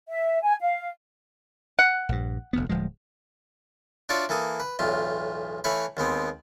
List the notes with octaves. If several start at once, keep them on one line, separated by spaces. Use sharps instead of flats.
E5
G#5
F5
F#5
A#1 G2
F1 D2 B3
D1 F3 G#3
D4 F4 F#4 C#5 D5 E5
E3 A#3 A4 D#6
B4
B1 E2 A2 F4
E3 A3 B4 C#5 F5 B5
D#2 G#3 B3 C4